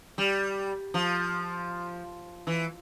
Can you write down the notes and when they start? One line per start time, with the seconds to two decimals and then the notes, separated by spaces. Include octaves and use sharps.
0.18 G3
0.94 F3
2.47 E3